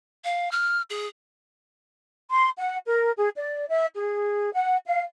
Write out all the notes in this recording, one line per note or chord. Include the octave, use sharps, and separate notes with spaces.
F5
F6
G#4
C6
F#5
A#4
G#4
D5
E5
G#4
F#5
F5